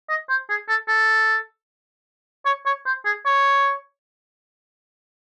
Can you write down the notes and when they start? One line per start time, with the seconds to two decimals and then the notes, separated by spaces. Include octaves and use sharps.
0.09 D#5
0.29 C5
0.50 G#4
0.69 A4
0.88 A4
2.46 C#5
2.66 C#5
2.86 C5
3.05 G#4
3.26 C#5